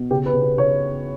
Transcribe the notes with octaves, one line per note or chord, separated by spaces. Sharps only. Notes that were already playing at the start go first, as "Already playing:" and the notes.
Already playing: B2
C#3 G4
B4
C#3
B4
C#3 C#5